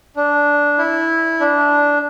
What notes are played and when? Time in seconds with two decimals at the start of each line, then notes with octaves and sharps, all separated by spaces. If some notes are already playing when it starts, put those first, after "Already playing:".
0.16 D4
0.78 E4
1.40 D4